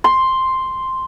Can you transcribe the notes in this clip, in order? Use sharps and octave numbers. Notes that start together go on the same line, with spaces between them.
C6